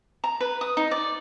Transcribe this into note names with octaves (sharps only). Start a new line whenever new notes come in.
A#5
B4
D#6
D#4
D5